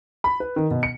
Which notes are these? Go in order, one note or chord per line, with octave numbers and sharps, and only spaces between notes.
B5
B4
D#3
B2
C#7